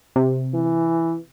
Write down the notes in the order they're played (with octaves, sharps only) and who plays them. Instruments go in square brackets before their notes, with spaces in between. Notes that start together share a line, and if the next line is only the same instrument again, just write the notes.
[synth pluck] C3
[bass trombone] E3